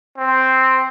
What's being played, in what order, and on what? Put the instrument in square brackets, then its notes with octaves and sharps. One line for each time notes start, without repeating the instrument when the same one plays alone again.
[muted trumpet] C4